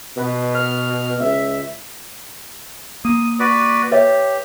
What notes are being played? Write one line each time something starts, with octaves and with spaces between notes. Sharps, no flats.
B2 B4
F6
C#2 E5
A#3 D#6
F#4 B4 D5
G4 B4 C#5 E5